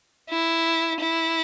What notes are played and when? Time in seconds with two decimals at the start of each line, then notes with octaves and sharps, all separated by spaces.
0.30 E4
1.00 E4